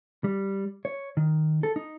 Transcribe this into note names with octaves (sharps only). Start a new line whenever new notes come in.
G3
C#5
D#3
A4
D#4